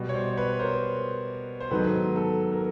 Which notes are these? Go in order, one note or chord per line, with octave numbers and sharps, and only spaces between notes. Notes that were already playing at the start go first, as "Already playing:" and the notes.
Already playing: B2 G3 B3
C#5
C5 D5
B4 C#5
A#4 C5
C5
G#2 D#3 F#3 B3 A4 B4
A4
A#4